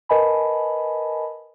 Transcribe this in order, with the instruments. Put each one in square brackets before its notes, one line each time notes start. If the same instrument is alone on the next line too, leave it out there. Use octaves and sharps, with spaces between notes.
[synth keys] A#4 B4 D#5 G#5 A5 B5